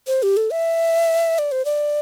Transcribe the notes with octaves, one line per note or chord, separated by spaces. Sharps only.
C5
G4
A4
E5
D5
C5
D5